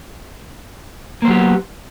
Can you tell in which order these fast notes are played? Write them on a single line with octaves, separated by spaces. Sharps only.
A#3 C5 F#3 G4 B3